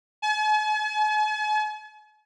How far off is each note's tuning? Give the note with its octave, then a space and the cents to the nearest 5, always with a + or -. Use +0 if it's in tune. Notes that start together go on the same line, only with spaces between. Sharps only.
G#5 +45